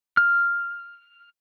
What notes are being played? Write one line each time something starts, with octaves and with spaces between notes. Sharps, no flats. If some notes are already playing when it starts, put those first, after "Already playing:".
F6